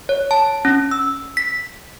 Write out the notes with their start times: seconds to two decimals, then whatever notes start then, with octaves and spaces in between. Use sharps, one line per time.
0.09 C#5
0.31 A5
0.65 C#4
0.91 E6
1.37 B6